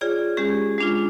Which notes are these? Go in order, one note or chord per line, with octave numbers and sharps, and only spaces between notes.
F4 G#4 C#5 D5
G#3 C#4 G4 G#4
G#3 D4 F4